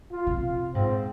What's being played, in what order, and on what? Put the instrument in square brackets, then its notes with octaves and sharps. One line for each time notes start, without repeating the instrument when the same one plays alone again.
[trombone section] F4
[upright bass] C3
[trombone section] F4
[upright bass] G#2 [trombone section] C4